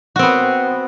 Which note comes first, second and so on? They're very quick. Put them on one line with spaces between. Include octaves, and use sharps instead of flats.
F#4 C4 B3